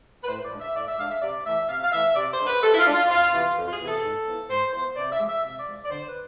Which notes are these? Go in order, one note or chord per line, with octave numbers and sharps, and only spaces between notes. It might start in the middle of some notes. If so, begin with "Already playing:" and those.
B4
A2 C5
D5
F3 G#3 D4
E5
A2 D5
E5
F3 G#3 D4 F5
E5
C3 D5
E3 A3 E5
C3 F5
F5
E3 A3 E5
C3 D5
C5
G#3 D4
B4
C3 A4
E4
F4
G#3 D4
F4
F2 F4
C3 E3 B3 F4
F2
F4
G#4
C3 E3 B3
A4
G#2
F3 B3 E4
G#2 C5
F3 B3 E4 C5
C3 D5
E5
F3 G#3
E5
C3 E5
D5
F3 G#3
D5
D3 C5
B4